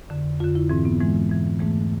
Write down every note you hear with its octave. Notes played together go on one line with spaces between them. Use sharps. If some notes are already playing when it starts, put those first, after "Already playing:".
F2 D3
F2 D3 F4
E4
G#2 E3 C4
B3
G#2 E3 G#3
G#2 E3
G#2 E3 A3